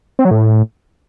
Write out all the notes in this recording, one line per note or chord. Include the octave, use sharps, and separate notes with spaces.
C4
F#3
A2